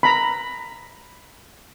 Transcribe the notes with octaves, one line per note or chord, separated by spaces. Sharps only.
A#5 B5